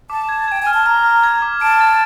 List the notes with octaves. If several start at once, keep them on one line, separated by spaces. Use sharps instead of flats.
A5 D6
G#6
G5 G#6
G#5 F6
A5
A#5 F6
F6
G#6
D6
A5 D7
A6